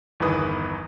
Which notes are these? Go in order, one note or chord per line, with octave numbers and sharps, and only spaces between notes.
G1 E2 D#3 E3 B4 D#6